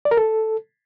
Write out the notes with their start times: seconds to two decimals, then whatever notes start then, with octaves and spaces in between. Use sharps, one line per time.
0.05 D5
0.11 A#4
0.17 A4